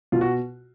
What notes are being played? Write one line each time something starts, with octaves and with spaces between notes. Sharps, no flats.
B2 F4
F#4